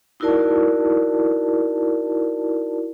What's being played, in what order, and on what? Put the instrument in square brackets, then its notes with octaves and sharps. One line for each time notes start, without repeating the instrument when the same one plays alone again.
[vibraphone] D#4 E4 F#4 A#4 D5 A5